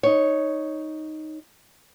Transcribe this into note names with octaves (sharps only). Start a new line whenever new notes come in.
D#4 C#5